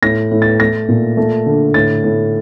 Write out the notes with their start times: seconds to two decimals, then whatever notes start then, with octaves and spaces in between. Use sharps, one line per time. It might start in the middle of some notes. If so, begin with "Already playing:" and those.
0.02 A2 A#6
0.32 A2
0.42 A6
0.60 A3 A#6
0.89 A#2
1.17 A3
1.46 D3
1.74 A2 A6
2.04 A2